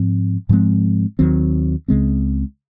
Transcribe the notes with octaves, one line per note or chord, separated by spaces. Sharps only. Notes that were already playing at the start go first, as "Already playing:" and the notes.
Already playing: G#2 F3 C4
G#2 F3 G#3 C4
D#2 D#3 F#3 C4
C#2 C#3 G#3 C4